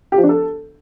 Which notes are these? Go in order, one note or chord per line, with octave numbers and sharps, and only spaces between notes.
G4
F3
D4
A4